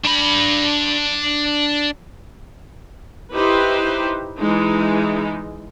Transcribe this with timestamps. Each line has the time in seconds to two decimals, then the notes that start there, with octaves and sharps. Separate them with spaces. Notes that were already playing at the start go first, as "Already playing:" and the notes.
0.04 D4 B5
3.34 D#4 E4 G4 B4 C5
4.39 E3 G#3 D#4